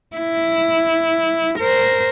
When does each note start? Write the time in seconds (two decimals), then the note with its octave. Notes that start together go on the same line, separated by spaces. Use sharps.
0.16 E4
1.59 A#4 C5